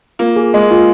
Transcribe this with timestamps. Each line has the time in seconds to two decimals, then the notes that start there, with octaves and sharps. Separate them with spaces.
0.19 A#3 F4
0.36 G#4
0.54 G#3 D#5
0.71 F4